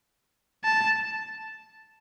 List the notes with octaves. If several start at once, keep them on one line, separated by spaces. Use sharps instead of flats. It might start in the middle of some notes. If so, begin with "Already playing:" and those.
A5